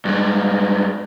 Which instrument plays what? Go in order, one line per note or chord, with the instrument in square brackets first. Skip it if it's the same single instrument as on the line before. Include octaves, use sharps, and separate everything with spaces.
[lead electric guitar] G2 G#3